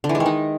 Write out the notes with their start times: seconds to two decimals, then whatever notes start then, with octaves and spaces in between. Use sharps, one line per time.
0.04 D3
0.09 E3
0.15 G#3
0.20 D#3
0.26 D#4